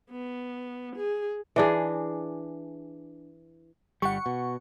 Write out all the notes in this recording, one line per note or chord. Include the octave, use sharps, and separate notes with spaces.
B3
G#4
E3 D4 G#4
G1 G3 F#5 C#6
B2